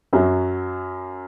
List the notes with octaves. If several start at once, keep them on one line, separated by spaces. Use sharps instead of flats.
F#2 F#3